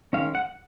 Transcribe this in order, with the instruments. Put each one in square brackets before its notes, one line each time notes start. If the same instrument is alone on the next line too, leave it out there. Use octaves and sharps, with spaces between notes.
[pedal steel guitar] D#3 G#3 C#4 F5
F#5